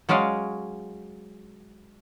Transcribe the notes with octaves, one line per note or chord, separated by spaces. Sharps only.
F#3 G#3 C#4 D5 D#5 F5